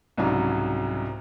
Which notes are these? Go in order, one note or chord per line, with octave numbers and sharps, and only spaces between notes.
C2 G#2 C#3 F#3